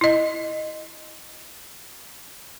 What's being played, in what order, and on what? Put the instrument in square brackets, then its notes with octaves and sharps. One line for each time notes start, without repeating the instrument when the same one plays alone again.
[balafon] E4 D#5